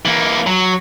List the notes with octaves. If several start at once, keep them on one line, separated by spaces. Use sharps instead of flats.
E3 A#3
F#3